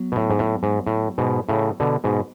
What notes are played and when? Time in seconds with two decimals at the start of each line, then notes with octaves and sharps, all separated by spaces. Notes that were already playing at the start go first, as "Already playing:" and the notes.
Already playing: F#3 B3
0.12 B2
0.16 A2
0.30 G#2
0.39 A2
0.63 G#2
0.87 A2
1.18 G#2 B2
1.49 A2 C#3
1.80 B2 D3
2.04 G#2 B2